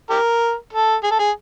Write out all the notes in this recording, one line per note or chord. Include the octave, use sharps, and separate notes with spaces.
G4 A#4
A4
G#4
A4
G#4